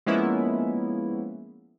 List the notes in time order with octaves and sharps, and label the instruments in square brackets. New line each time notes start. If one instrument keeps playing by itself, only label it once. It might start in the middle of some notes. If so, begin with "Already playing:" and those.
[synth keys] F3 G#3 A#3 B3 C#4 E4